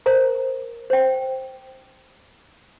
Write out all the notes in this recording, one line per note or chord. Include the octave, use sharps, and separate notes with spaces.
A#4 C5 A#5
C5 G5